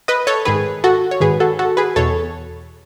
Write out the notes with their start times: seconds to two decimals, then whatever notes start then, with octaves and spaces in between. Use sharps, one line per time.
0.08 B4 D#5
0.27 A4 C#5
0.45 G#2 D#3 G#4 B4
0.84 F#4 A4
1.11 C#5
1.20 G#2 D#3 G#4 B4
1.40 F#4 A4
1.59 F#4 A4
1.77 G#4 B4
1.96 E2 B2 A4 C#5